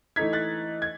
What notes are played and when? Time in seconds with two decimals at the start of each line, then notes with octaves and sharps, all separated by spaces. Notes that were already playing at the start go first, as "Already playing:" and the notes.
0.16 E3 A3 D#4 G#6 B6
0.33 F#6 A6
0.82 G#6